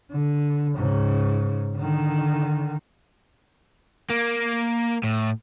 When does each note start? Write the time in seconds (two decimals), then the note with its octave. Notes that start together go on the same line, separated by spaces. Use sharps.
0.12 D3
0.75 G#2 C#3
1.76 D3 D#3
4.10 A#3
5.03 A2